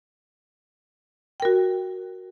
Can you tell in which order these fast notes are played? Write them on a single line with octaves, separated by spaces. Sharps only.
G5 A#4 F#4